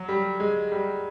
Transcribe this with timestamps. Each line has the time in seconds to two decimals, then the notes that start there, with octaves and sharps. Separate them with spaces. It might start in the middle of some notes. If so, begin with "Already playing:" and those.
Already playing: F#3
0.09 G3
0.40 G#3
0.72 G3